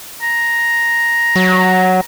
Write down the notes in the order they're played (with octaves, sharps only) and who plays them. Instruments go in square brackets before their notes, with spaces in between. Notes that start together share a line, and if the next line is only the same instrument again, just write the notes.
[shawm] A#5
[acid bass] F#3